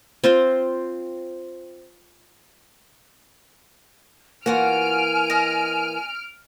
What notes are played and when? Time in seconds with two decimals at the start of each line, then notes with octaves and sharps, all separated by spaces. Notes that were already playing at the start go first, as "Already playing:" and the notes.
0.24 C4 F4 C5
4.46 E3 A#3 F4 F#4 F#5 G#5 F6 D7
5.30 D#5